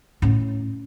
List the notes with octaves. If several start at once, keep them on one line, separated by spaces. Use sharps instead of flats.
A2 C#4